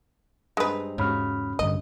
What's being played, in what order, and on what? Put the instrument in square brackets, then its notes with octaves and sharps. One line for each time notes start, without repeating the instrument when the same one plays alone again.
[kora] G2 C4 D#4 [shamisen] G#3 B4
[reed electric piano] E2 B5 F6 [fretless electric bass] G#2 [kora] C#3 F#4
[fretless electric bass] A1 G2 D3 [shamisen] D#5